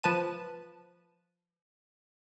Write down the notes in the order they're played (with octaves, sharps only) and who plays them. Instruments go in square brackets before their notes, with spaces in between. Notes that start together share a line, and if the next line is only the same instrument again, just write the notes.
[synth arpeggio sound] F3 B4 A5 D#7